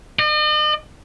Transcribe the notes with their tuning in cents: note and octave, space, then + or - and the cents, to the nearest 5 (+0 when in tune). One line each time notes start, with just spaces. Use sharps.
D#5 -45